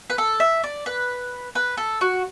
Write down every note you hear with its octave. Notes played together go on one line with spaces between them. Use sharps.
B4
A4
E5
D5
B4
B4
A4
F#4